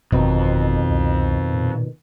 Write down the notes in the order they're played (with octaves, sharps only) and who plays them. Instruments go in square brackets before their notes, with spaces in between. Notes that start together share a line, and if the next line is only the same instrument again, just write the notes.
[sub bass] G1 [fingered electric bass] F2 [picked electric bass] B2 D#3
[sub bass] C2
A#2